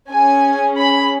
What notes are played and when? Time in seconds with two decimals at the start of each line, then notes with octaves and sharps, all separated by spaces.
0.10 C#4 G#4 G#5
0.78 B5